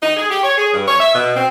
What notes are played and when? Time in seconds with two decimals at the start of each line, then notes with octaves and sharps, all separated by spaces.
0.03 D#4
0.16 G#4
0.30 G4
0.44 C#5
0.57 G#4
0.73 G2
0.88 C#5
1.00 E5
1.15 B2
1.35 C4